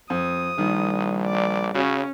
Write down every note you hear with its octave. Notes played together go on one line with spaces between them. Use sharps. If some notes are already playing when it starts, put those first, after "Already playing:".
F2 D#6
A#1 D#3 G3
D5
C#3 C#4 F#4